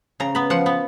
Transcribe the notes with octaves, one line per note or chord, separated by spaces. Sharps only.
C#3 A#5
B3 B5
F3 F#5
B3